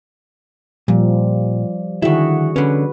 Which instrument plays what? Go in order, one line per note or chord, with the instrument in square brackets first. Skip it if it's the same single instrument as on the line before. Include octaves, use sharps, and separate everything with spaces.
[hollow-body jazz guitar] A#2 [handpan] F3 G3
[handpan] D3 F#4 G#4 [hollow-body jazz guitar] D#3 E4
[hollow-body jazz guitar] D3 C#4 [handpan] B4